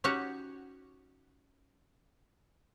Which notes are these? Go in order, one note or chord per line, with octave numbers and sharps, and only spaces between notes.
C#4 D#4 F#4 G4 C#5 F#5